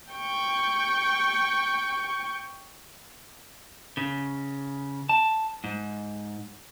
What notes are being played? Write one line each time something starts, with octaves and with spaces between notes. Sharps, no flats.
G5 C#6
C#3
A5
G#2